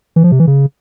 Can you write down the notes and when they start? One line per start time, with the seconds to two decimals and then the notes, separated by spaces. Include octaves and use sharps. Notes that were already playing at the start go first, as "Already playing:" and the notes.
0.16 E3
0.24 F3
0.32 C3
0.39 E3
0.47 C#3